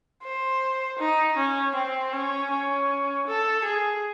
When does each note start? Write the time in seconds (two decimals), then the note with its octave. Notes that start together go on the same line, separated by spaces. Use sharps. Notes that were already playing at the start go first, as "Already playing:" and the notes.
0.23 C5
0.99 D#4
1.37 C#4
1.75 C4
2.13 C#4
2.51 C#4
3.27 A4
3.65 G#4